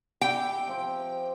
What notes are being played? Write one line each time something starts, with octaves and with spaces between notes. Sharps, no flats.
G4 E5 G5 G#5
F3 C4